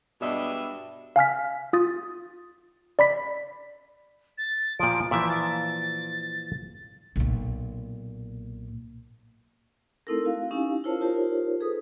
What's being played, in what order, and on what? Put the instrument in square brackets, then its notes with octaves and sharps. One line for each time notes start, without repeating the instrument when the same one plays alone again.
[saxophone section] G2 B2 G#3 D4 D#5 E5
[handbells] F5 G#5 F6 B6
F4 D#6 A6
D5 B5 B6
[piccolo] A6
[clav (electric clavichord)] A#2 F3 [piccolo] D7
[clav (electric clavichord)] A#2 E3 F3 [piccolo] E5
[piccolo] A6
[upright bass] B1 A#2
[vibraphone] A3 C4 D#4 E4 A4 A#4
F#4 F5
C#4 D#4 E4 G4 F5 G#5
E4 F4 A#4 C5 C#5 A5
D#4 F4 G4 A#4 C5 C#5
G#4 A4 B4 D#6